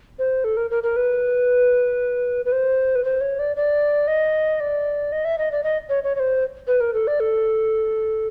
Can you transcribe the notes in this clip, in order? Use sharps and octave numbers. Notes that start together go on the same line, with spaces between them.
C5
A4
A#4
A#4
A#4
B4
B4
C5
B4
C5
C#5
D5
D5
D#5
D5
D#5
E5
D#5
D5
D#5
C#5
C#5
C#5
C5
B4
A#4
A4
D5
A4